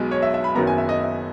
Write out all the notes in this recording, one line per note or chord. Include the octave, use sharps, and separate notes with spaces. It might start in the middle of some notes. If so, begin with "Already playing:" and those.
Already playing: B1 B2 G#3 B3
C#5
E5
E5
B5
F#1 F#2 D#3 F#3 B3 A#5
G#5
E5
D#5
E5